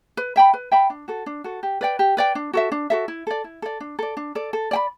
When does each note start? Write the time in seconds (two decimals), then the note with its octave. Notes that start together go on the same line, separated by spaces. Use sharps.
0.17 B4
0.36 E5 G5 B5
0.54 B4
0.72 E5 G5 B5
0.90 D4
1.08 F#4 A4
1.26 D4
1.44 F#4 A4
1.63 G4
1.81 B4 D5 G5
1.99 G4
2.17 B4 D5 G5
2.35 D4
2.53 F#4 A4 E5
2.72 D4
2.90 F#4 A4 E5
3.08 E4
3.27 A4 D5
3.44 E4
3.62 A4 D5
3.80 D4
3.99 A4 D5
4.17 D4
4.35 A4 D5
4.53 A4
4.71 D5 G5 B5